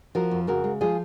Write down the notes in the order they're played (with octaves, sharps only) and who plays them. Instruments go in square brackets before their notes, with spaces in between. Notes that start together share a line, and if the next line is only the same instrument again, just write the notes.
[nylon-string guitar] F3 F#4 A#4
F2
C#3 F#4 A#4
G#3
F3 F4 G#4